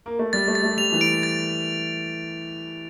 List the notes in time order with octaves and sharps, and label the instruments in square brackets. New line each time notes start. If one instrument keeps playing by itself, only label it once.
[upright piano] A#3
A3
[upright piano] G3 [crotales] A6
[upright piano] A3
[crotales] A6
[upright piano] A3
[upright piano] G3 [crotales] F7
[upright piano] E3
[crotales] D7
A6